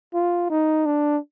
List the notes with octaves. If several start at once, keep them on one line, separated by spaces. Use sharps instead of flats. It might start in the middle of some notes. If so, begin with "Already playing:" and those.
F4
D#4
D4